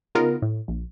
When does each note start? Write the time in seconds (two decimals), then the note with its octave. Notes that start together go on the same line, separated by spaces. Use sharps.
0.15 C#3 B3 D#4 F4 A#4
0.42 A2
0.68 A#1